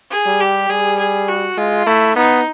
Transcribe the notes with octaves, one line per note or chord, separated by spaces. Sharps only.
G#4
G3
G4
G3 G#4
G#4
F#4
G#3 F4
A3 E4
B3 D#4